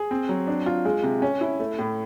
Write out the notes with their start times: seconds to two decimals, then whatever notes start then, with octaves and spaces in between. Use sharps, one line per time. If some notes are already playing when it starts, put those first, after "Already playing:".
Already playing: G#4
0.11 C4
0.29 F#3
0.47 D4
0.66 F4
0.85 G#3
1.03 C3
1.22 C#4
1.41 E4
1.59 A3
1.79 A2